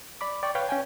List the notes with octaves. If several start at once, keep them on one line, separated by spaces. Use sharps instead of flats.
D5 B5 D6
D5 G5 C#6
B4 C#5 F5 G5
C#4 G5 G#5